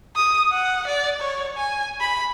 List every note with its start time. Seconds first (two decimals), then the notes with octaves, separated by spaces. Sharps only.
0.16 D#6
0.52 F#5
0.87 D5
1.21 C#5
1.57 G#5
2.01 B5